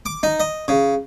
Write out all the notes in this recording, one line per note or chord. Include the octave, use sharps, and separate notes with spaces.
D6
D#4
D#5
C#3